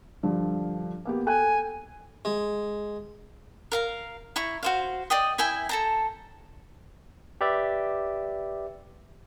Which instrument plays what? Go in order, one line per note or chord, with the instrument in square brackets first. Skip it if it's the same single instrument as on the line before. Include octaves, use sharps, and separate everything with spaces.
[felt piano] G2 D3 F3
A#3 B3 G4
[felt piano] A4 G5 F#6 [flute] G#5
[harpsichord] G#3
[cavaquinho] A#4 F5 A#5
E4 A#5 C#6
F#4 C5 F5
D5 D#5 G5 D#6
E4 E5 G5 G#5
A4 A5 A#5
[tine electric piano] G4 B4 D5 E5